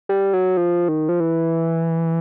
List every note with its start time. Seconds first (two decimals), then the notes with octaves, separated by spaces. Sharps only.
0.09 G3
0.33 F#3
0.57 F3
0.89 D#3
1.09 F3
1.20 E3